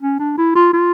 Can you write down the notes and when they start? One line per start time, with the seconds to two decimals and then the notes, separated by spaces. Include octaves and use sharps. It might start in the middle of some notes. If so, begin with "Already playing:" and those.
0.02 C#4
0.19 D4
0.38 E4
0.55 F4
0.73 F4